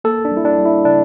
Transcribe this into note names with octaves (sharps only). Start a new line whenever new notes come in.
A#3 A4
D4
G3
E4
D4
G3
E4
C#3 D4